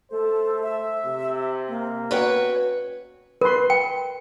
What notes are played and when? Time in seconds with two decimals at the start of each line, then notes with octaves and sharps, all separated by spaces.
0.11 A3 A4 C5
0.63 E5
1.05 C3
1.68 A#3
2.11 B2 C#4 F#4 B4 C#5 G5
3.41 A#4 B4 C6
3.70 G5